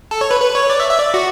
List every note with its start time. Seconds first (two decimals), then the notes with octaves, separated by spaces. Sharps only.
0.11 A4
0.21 C#5
0.31 B4
0.41 B4
0.55 C#5
0.70 D5
0.80 E5
0.90 E5
0.99 D5
1.14 F#4